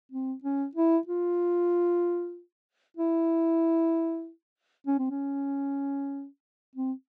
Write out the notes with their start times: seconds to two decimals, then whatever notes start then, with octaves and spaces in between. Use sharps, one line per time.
0.12 C4
0.44 C#4
0.75 E4
1.07 F4
2.97 E4
4.87 C#4
4.99 C4
5.11 C#4
6.76 C4